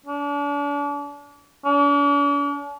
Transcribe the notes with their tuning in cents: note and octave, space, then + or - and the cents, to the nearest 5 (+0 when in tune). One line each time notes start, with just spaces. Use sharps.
D4 -40
D4 -45